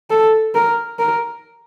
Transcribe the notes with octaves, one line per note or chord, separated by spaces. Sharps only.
A4
A#4
A#4